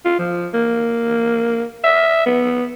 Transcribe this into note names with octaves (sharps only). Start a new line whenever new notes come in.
F4
F3
A#3
E5
B3